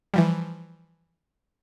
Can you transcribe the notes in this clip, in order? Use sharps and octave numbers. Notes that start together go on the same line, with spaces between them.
E3 F3 G3